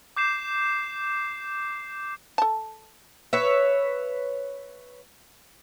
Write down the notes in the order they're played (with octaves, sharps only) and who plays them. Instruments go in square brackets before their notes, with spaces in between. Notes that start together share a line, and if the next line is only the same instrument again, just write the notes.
[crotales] D6 G6 C7 E7
[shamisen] A4 A5
[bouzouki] B4 C#5 E5